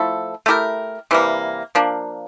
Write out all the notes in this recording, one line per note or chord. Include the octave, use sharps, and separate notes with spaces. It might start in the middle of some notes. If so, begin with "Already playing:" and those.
Already playing: F3 A3 E4 A4
A3 E4 G4 A#4
C3 E3 G3 A#3
F3 A#3 D4